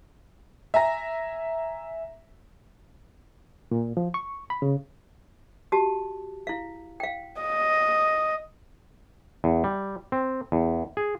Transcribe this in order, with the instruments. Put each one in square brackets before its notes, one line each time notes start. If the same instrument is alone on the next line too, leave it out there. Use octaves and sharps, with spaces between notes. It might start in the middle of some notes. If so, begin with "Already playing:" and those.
[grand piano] E5 G#5 A#5 A#6
[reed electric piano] A#2
F3
C#6
B5
C#3
[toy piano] F#4 G4 A5
E4 F5
F5 G5
[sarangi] D#5
[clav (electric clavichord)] E2
G3
C4
E2
G#4